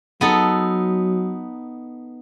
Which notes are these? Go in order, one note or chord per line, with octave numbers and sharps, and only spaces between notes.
F#3 B3 D#4 A4